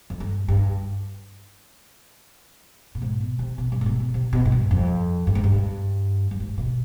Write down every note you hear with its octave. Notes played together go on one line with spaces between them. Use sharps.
F2
G2
G2
B2
G#2
B2
C3
B2
G2
G#2
B2
B2
C3
B2
G#2
G2
F2
G2
G#2
G2
G2
G#2
B2